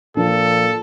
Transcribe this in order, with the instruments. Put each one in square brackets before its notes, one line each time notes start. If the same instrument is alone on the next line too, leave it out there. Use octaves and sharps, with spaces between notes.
[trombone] A#2 [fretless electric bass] F3 D4 [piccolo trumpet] A4